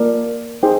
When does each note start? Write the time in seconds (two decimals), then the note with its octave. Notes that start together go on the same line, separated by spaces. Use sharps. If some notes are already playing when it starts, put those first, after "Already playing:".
Already playing: A#3 F4 A#4 D5
0.63 D#4 G#4 C5 G5